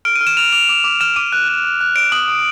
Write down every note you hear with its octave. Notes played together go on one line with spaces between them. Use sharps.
F6 D7
D#7
F6
E7
F6 F7
D6 F7
D6
D6
F6 E7
D6 D#7
F#6
F#6
F#6
F#6
D#6 D7
D#6 F#7
D#6